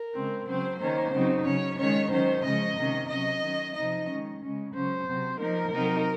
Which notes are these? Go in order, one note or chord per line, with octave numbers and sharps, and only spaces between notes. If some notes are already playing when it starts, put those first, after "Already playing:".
Already playing: A#4
C#3 G#3 C4
C#3 F#3 C4 C5
D#3 A#3 C#4 C5
C#3 F#3 C4 D#4
C#3 F#3 C#4 C#5
D#3 G#3 C#4 C#5
D#3 F#3 C#4 C5
C#3 F3 G#3 C#4 D#5
C3 D#3 A#3 C#4
C3 F#3 C#4 D#5
D#3 F#3 C#4
C3 F3 C4 D#4 D#5
D#3 G#3 C#4
C#3 G#3 C#4
C#3 F#3 C#4 C5
C3 F#3 C4
F3 A#3 D#4 A#4
C3 F#3 C4 D#4